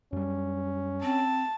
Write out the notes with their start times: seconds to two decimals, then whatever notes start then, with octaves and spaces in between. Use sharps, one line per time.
0.13 F#2 G3 C#4
1.03 C4 A5